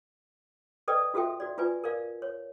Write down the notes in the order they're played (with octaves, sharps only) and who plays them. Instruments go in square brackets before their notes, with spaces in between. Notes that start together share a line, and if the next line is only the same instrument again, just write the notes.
[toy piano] A4 B4 D5 D#5 G5 D#6
F4 F#4 A4 E5 G5
F#4 D5
F4 B4 D5 G#5
A#4 D5 F5
C#5